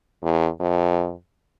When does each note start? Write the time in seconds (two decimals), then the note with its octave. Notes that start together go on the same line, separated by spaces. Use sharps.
0.22 E2
0.60 F2